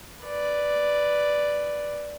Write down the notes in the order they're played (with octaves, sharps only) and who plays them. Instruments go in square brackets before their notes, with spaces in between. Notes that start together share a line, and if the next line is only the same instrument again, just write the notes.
[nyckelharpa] B4 D5